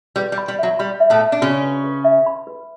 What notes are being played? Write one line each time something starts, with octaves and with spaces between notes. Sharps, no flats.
G3 B4
G3
B5
G3
F#3 E5
G3 B5
E5
A2 A3
E5
D4
C#3 C#4 F#4
B4
B4
E5
B5
B4